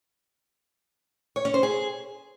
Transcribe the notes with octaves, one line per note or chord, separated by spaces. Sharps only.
C#5
C#4
C5
G#4